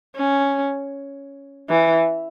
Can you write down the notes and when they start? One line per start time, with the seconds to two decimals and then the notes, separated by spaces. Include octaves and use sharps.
0.16 C#4
1.69 E3